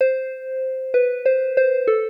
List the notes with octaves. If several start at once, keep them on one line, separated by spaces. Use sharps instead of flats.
C5
B4
C5
C5
A4